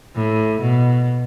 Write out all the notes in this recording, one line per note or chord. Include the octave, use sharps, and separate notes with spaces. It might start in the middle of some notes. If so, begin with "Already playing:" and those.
A2
B2